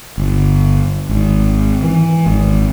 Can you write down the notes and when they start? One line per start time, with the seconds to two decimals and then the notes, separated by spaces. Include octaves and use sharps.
0.18 G1
1.09 G#1
1.83 E3
2.26 G#1